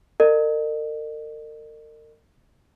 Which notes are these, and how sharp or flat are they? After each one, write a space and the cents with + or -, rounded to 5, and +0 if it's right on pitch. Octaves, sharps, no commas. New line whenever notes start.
A#4 -40 D#5 -40